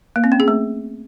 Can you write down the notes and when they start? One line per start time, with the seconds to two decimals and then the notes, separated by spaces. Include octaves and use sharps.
0.16 A#3
0.24 C4
0.32 C#4
0.40 G#4
0.48 A3